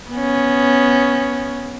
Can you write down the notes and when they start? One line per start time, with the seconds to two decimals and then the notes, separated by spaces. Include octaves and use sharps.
0.11 B3 C#4